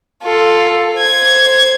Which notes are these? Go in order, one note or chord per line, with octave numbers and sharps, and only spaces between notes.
F4 A4
C5 G#6